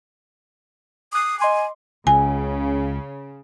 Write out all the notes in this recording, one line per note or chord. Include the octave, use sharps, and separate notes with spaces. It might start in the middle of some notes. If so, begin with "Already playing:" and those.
D6 D#6 F#6 C7
D#5 G#5 C6 D6
C#2 C#3 G#5